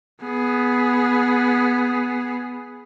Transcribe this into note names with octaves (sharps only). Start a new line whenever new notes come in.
B3 G#4